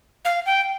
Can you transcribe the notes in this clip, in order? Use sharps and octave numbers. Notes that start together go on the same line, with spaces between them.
F5
G5